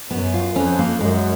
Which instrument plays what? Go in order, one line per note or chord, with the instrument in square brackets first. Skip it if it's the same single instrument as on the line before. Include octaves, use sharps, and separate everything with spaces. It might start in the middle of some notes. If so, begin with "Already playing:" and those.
[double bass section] F#2 [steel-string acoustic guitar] B3
[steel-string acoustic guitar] F4
[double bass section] F2 [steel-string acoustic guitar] C#4
[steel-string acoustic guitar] A#3
[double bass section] F#2 [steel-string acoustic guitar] G#3